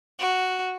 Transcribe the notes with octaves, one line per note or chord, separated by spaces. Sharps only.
F#4